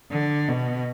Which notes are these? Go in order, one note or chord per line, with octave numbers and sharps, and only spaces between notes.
D3
B2